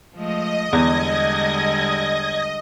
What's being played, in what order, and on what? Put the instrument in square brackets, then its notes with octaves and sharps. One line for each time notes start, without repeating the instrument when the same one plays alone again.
[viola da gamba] F3 G#3 A3 [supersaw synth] D#5
[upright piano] E2 [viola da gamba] D3 G3 G#3 [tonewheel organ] G#6 A#6